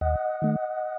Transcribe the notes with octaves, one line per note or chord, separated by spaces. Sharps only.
D#2 D#5 F#5
D#3 A3